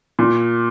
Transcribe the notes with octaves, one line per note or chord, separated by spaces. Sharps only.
A#2